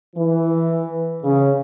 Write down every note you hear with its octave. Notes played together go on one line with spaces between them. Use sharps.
E3
C#3